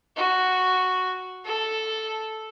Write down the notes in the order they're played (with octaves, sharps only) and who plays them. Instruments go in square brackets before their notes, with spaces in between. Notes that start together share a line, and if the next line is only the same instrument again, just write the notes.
[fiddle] F#4
A4